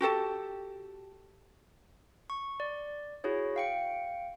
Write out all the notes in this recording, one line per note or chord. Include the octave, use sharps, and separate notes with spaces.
F#4 G4 A4 A5
C#6
D5
E4 F#4 G#4 C#5
F5 G5 C#7